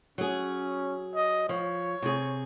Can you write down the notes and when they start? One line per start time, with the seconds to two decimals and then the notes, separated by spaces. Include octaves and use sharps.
0.18 F#3 C#4 G#4
1.15 D#5
1.49 F3 C#5
2.02 C3 G#4